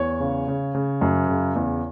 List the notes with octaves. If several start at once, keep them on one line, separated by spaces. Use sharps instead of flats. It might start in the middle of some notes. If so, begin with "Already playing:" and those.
Already playing: E2 C#5
C#3
C#3
C#3
F#2
C#3
E2